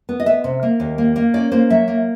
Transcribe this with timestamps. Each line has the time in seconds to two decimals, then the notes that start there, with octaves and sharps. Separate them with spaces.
0.09 B3
0.20 D#5
0.26 B3 E5
0.44 C3
0.63 A#3
0.80 D#2
0.98 A#3
1.16 A#3
1.34 C#4 D5
1.52 A#3 C5
1.70 F#3 E5
1.88 A#3